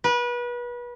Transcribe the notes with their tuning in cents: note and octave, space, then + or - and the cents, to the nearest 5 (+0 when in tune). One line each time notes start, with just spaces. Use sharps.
B4 -30